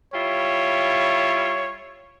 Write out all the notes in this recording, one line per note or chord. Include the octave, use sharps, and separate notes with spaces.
G3 E4 F4 C#5